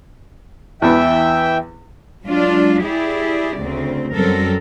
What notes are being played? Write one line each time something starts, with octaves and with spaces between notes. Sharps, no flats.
E2 E3 B3 E5 G5
F#3 G#3 D4 F4
E4 G4 G#4 D5
D2 C#3 C4
F#2 F#3 G3 C4 A4 A#4